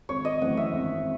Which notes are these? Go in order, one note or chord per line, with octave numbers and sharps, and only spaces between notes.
G#1 C#5
D#5
F#2 E3 A3 C4 F#5
E5
G#1